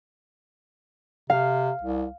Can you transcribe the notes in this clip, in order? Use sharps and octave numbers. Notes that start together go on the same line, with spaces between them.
C3 F5
C2